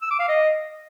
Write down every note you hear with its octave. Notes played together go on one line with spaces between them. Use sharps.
E6
D6
F5
D#5